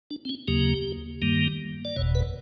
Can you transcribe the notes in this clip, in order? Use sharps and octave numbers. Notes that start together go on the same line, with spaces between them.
D4
C4
C#4
D#2 C#3 F#3 A#3 G4
G2 D#3 G3 A#3
D5
F#1 E2 B2 C#5
B4